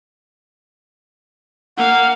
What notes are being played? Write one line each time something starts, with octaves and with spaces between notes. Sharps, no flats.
A#3 F5 F#5